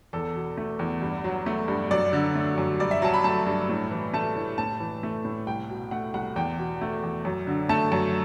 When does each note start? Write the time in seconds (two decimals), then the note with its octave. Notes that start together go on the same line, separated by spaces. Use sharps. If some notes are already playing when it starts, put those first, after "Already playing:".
0.13 E2 A4
0.36 B2
0.57 A3
0.79 E2
1.02 G2
1.24 F#3
1.46 A3
1.68 G2
1.91 F#2 D5
2.13 D3
2.35 A3
2.58 F#2
2.80 G2 D5
2.91 E5
3.02 F#3 A5
3.13 B5
3.24 A3 A5
3.47 G2
3.69 A2
3.91 E3
4.13 A3 A5
4.36 A2
4.58 A2 A5
4.80 E3
5.03 A3
5.25 A2
5.47 C2 G5
5.69 B2
5.91 A3 F#5
6.14 C2 F#5
6.36 E2 G5
6.59 B2
6.81 A3
7.03 E2
7.25 F#2
7.47 D3
7.69 A3 A5
7.92 F#2